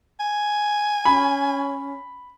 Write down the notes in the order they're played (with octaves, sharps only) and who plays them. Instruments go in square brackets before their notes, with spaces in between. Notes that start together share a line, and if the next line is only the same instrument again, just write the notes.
[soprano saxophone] G#5
[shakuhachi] C#4 [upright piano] B5